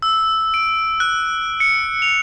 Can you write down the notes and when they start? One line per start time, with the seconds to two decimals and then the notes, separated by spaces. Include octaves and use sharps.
0.02 E6
0.54 D7
1.00 F#6
1.60 C#7
2.02 F7